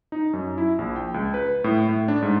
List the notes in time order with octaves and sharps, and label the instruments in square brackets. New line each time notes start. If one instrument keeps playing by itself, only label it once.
[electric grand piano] D#4
F#2
E4
A#1
G5
C#2
B4
A2
A2
D4
G#2